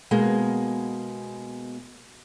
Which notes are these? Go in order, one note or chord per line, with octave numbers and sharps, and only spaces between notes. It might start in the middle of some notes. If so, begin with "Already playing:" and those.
B2 G#3 A#3